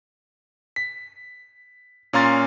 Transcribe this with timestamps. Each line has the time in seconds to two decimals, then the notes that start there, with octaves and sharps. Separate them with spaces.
0.76 B6
2.13 A#2 C#4 F5 A#5 C6 A6